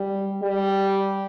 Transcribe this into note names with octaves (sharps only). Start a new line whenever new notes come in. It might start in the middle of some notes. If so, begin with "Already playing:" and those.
Already playing: G3
G3